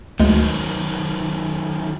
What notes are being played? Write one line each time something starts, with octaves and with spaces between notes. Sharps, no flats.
D2 D#3 F#3 G#3